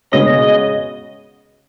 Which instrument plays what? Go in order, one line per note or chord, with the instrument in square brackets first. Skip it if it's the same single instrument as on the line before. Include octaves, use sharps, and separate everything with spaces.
[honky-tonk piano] C#3 G#3 B3 F#4 C#5 [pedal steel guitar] D#5